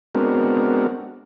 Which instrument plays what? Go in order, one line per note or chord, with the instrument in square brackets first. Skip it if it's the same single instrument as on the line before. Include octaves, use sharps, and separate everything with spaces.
[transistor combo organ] G#3 B3 C4 D4 F#4 A#4